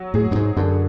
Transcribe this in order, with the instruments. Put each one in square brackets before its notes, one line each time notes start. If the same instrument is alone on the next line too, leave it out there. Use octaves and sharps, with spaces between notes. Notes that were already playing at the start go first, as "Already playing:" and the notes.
Already playing: [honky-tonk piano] F#3
[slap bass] A2 [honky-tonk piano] G#4
[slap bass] F#2
G#2
[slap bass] F#2 [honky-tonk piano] D3